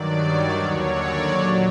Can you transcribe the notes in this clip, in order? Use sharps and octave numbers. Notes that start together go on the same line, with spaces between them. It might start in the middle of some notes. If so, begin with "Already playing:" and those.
Already playing: G2 D#3 F#3 D5
D5
D#2 D3 F#3 C#5
D5
A#2 F#3